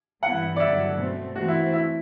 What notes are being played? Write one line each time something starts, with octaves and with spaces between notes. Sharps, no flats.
G2 E3 G3 B3 E4 F#5
D5
G2 D3 F#3 E5
B2 A3 C4
E3 A3 C4 F#4
E4
E4